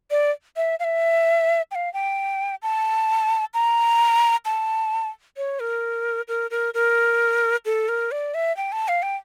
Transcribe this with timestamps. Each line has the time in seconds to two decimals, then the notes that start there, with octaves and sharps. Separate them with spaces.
0.11 D5
0.57 E5
0.80 F5
0.84 E5
1.71 G5
1.75 F5
1.94 G5
2.63 A5
3.54 A#5
4.45 A5
5.37 C#5
5.60 A#4
6.28 A#4
6.51 A#4
6.74 A#4
7.65 A4
7.88 A#4
8.12 D5
8.34 E5
8.57 G5
8.72 A5
8.88 F5
9.02 G5